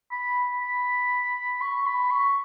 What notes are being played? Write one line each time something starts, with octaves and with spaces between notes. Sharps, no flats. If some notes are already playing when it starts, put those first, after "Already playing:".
B5
B5
C#6
B5
C#6